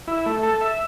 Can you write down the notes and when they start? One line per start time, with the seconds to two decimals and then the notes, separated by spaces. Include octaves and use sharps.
0.08 E4
0.26 A3
0.43 A4
0.61 E5